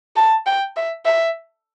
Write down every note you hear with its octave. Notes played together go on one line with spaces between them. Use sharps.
A5
G5
E5
E5